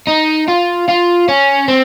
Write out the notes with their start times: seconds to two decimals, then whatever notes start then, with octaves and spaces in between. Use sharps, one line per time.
0.08 D#4
0.48 F4
0.89 F4
1.28 C#4
1.68 C4